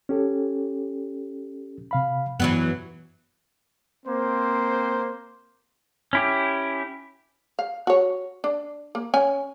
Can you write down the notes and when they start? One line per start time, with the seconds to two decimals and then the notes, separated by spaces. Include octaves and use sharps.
0.09 C#4 G4 A4
1.91 C3 F5 B5
2.40 F#2 E3 F#3 B3
4.06 A#3 C4 C5
6.13 C#4 E4 G4
7.59 F5
7.87 F#4 C#5
8.44 D4
8.95 A#3
9.14 C#4 G#5